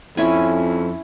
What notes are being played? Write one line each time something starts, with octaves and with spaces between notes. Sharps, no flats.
F2 C#4 E4 G#5